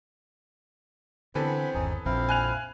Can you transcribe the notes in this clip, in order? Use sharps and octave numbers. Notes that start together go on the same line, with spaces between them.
D3 E3 B3 C4 A4 F#5 G#5 B5
G1 D#2 C#4 D#4 G#4
A#1 F2 C4 E4 F5
G#5 F#6 F7